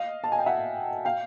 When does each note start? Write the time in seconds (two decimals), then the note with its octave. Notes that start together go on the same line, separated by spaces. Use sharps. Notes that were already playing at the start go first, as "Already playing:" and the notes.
Already playing: D#5 F5
0.24 A5
0.32 G#5
0.39 G5
0.46 E5 F#5
1.05 F5 G5